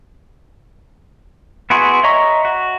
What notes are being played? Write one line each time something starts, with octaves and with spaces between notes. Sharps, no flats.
B3 E4 F#4 G#4 C6
C#5 D#5 E5 A#5 C#6
F#4